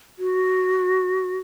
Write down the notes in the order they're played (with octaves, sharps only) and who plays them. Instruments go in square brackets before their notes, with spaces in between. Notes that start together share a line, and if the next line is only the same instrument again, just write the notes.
[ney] F#4